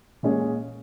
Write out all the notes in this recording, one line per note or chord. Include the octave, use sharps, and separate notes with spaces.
A#2 G#3 C#4 G#4